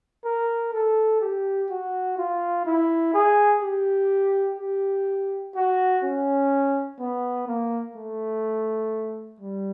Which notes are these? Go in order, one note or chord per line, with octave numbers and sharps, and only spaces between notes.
A#4
A4
G4
F#4
F4
E4
G#4
G4
G4
F#4
C#4
B3
A#3
A3
G3